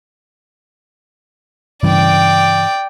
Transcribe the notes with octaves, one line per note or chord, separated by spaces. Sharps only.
G2 C#3 E3 D5 G5